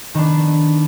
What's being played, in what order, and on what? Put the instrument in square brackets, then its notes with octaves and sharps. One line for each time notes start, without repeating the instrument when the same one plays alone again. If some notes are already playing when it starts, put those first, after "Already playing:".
[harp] D#3 B3 D4